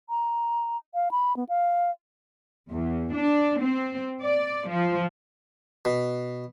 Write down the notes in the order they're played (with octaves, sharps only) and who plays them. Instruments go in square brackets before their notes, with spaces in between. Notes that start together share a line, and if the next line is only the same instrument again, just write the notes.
[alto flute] A#5
F5
B5
B3
F5
[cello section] E2
D4
C4
D5
F3
[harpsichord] B2